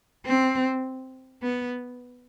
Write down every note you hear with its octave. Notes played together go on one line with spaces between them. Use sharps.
C4
B3